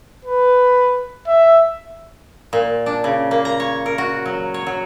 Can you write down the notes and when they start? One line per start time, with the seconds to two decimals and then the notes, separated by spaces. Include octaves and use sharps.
0.25 B4
1.28 E5
2.53 A#2
2.86 D4
3.04 C#3
3.31 A#3
3.45 A#5
3.60 C#5
3.86 A#4
3.98 F#4
4.26 F#3
4.54 C#5
4.66 F#3